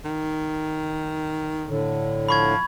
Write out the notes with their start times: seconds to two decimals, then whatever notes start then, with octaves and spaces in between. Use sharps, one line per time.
0.05 D#3
1.68 A2 D3
2.29 F3 B5 C#6 G#6